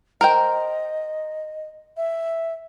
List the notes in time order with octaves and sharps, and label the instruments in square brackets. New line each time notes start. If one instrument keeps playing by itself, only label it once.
[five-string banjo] A#4 C5 G5 [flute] D#5
[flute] E5